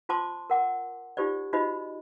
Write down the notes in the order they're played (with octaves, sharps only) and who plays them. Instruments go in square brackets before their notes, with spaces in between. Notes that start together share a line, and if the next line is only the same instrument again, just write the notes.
[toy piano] F4 C5 A5 C6 D6
A#4 F#5 D6
D#4 F4 G4 C5 D5
D#4 F4 F#4 C5 D#5 B5